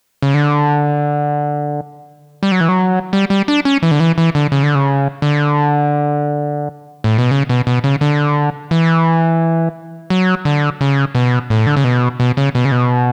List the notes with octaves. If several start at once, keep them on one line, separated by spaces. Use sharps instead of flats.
C#3
D3
G3
F#3
E3
F#3
G3
G3
D4
C#4
E3
D3
E3
E3
D3
C#3
D3
C#3
D3
A2
B2
C#3
B2
B2
C#3
D3
E3
F#3
D3
C#3
B2
A2
D3
C#3
B2
B2
C#3
B2
C#3
B2